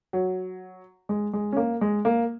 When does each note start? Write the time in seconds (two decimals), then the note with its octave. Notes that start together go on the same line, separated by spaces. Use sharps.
0.13 F#3
1.09 G#3
1.33 G#3
1.52 C#4
1.57 A#3
1.81 G#3
2.05 A#3